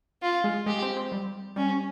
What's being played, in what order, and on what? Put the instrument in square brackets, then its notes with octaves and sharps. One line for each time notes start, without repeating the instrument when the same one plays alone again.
[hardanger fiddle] F4
[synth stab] G#3
[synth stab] G#3 [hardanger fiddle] G4
[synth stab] C4
C4
G3
[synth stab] G3 [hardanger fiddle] C#4